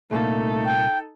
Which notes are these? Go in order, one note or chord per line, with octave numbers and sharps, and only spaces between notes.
C2 A#2 A3 A#3 D#4 A4
G5